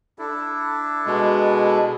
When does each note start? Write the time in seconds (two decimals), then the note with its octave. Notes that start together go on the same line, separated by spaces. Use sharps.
0.19 D4 E4 A4
1.06 B2 G#3